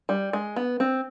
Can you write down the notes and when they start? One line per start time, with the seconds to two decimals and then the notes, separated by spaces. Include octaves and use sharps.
0.09 G3
0.33 G#3
0.56 B3
0.80 C4